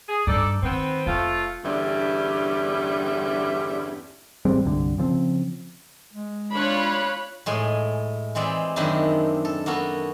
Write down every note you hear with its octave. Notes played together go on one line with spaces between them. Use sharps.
G#4
G2 G3 D#4 A4 D5
D#3 B3 C4
F1 F3 A3 F4
E2 G2 D3 G3 C#4 E5
A1 G3 G#3 C4
C2 G2 D3
C#3 F3 C4
G#3
D4 F4 C#5 B5 F#6
A2 G#3 A4 G#5
E3 G#3 C4 D5 E5
F#2 D#3 G#3 C4 D4 E4
A4
A#3 B3 F#4 A4